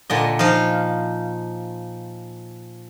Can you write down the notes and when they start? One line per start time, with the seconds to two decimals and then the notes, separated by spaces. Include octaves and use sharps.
0.10 A#2 D3 D#5
0.39 F3 D#4 F5